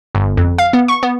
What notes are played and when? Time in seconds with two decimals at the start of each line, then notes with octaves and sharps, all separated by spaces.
0.15 G1
0.37 F2
0.58 F5
0.73 B3
0.88 C#6
1.03 B3